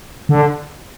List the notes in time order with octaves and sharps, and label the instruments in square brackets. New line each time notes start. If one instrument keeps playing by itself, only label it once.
[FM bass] D3